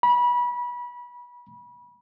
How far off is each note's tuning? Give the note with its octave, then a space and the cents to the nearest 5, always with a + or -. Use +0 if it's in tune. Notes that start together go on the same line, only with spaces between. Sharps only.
B5 -25